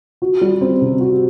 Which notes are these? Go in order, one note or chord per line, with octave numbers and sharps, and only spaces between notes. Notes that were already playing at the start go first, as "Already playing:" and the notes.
F#4
G3
C4
C3
F#4